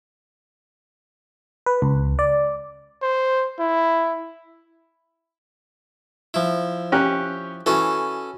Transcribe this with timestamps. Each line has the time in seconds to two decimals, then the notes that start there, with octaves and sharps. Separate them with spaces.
1.66 B4
1.82 C#2
2.19 D5
3.02 C5
3.59 E4
6.34 F3 E4
6.92 C#4 G4 F#6
7.66 E3 C#4 F#4 A4